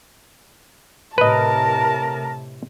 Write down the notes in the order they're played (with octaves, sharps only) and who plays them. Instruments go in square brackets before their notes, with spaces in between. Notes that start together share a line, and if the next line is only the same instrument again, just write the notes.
[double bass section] A2 C3 [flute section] A#4 [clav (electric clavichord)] B4 D#5 [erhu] A5